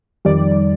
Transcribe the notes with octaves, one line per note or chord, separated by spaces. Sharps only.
F2 D#3 G3 D5